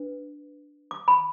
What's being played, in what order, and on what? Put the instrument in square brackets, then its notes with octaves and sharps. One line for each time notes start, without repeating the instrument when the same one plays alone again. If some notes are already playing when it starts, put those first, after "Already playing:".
Already playing: [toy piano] D4 B4
D6
B5